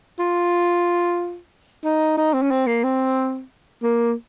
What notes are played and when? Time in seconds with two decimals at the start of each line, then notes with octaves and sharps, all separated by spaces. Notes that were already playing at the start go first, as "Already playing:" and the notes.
0.19 F4
1.84 D#4
2.17 D#4
2.34 C4
2.42 C#4
2.51 C4
2.67 A#3
2.84 C4
3.83 A#3